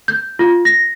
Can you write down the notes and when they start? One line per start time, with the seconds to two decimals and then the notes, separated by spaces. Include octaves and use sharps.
0.08 G6
0.39 F4
0.65 A#6